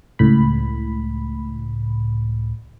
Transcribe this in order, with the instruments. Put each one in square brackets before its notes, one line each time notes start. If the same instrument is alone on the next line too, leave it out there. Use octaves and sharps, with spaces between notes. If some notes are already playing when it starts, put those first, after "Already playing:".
[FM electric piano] C#2 A2 B5